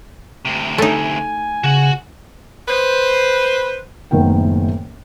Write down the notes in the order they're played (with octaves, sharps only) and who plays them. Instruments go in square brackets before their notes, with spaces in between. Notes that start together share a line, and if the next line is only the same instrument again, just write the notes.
[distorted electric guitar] D2 C3
[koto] A3 D#4 [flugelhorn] G#5
[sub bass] C#3 [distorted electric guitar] F#4 F#5
[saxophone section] B4 C5
[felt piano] F#1 A2 D#3 B3 A#4 G5